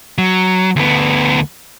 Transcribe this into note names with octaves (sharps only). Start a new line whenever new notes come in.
F#3
D2 B3